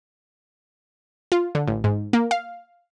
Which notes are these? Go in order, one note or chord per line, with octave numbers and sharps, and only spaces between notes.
F4
D3
A1
G#2
A#3
F5